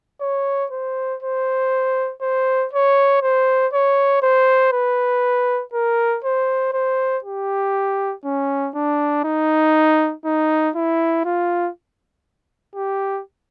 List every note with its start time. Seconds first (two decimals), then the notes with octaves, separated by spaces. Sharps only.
0.21 C#5
0.71 C5
1.22 C5
2.22 C5
2.73 C#5
3.22 C5
3.73 C#5
4.22 C5
4.72 B4
5.73 A#4
6.24 C5
6.73 C5
7.24 G4
8.25 C#4
8.74 D4
9.24 D#4
10.25 D#4
10.75 E4
11.25 F4
12.75 G4